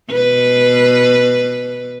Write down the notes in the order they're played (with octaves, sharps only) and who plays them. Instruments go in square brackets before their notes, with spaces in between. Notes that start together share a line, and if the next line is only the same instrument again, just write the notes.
[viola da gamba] B2 B4